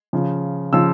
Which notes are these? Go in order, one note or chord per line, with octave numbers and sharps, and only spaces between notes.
C#3 F3
C#3 F3 E6